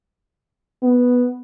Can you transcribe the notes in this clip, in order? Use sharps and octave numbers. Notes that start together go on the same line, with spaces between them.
B3